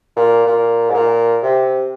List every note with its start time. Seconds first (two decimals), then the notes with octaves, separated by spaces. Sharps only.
0.16 A#2
0.47 A#2
0.90 G#2
0.94 A#2
1.42 C3